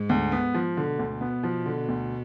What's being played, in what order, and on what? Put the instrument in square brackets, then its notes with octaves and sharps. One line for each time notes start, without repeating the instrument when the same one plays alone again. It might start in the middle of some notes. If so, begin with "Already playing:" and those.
Already playing: [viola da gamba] G#2
[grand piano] D2
B3
F3
[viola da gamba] B2 [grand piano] D3
[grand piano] D2
B3
F3
D3
D2